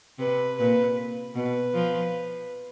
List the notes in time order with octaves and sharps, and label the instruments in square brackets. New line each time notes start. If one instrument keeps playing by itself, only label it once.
[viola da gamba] C3 [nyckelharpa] B4
[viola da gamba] A#2 [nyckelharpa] B4
[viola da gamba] B2 [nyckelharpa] B4
[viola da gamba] F3